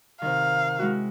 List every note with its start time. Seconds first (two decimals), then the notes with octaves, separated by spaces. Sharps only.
0.22 C3 D#3 F5
0.79 G#3 E4 F#4